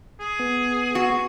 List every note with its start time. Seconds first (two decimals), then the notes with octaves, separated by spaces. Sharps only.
0.20 G#4
0.39 B3
0.95 F#4